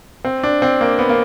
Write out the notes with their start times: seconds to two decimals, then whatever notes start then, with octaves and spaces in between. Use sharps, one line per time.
0.25 C4
0.43 D4
0.62 C4
0.81 A#3
0.99 B3
1.09 A#3